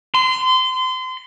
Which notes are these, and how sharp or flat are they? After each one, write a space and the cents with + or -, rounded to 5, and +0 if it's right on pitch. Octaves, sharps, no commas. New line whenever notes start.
C6 -30